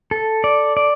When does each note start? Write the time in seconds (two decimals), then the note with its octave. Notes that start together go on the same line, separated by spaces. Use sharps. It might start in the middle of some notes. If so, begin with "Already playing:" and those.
0.11 A4
0.44 D5
0.77 D5